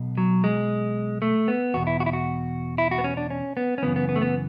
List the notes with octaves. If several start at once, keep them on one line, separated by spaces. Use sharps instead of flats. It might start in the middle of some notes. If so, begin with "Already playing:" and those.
Already playing: B1 B2
F#3
G#3
A3
B3
E2 B2 F#4
E4
F#4
E4
F#4
E4
F#4
B3
C#4
D4
C#4
B3
C#4
F#2 C#3 E3 B3
B3
B3
A3
B3